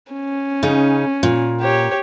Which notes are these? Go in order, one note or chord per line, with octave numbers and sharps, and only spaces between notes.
C#4
C#3 D#4
A#2
G4 C#5